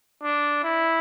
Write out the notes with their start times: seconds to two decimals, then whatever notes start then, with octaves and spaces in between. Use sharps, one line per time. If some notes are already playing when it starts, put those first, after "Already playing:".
0.23 D4
0.64 E4